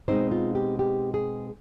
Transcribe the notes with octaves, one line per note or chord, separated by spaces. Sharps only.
B2 G#3 C4 D#4 C5
F4
G4
G4
G#4